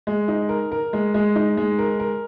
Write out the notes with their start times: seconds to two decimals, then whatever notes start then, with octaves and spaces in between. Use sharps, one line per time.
0.07 G#3
0.28 D#4
0.49 A#4
0.72 A#4
0.93 G#3
1.14 G#3
1.36 D#4
1.57 G#3
1.79 A#4
2.00 A#4